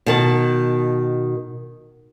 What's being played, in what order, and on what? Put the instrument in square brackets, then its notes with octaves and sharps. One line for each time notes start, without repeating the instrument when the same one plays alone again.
[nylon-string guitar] B2 D#3 A5